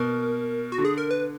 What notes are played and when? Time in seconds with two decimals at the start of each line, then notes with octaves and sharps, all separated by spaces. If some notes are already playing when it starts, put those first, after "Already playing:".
Already playing: B2 A#4
0.72 F#4
0.78 D3
0.85 G#4
0.98 A#4
1.11 B4